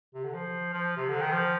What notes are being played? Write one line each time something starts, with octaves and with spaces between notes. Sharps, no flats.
C3
D3
F3
F3
C3
D3
D#3
F3